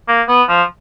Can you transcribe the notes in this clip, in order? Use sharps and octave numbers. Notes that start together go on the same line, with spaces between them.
A#3
B3
F3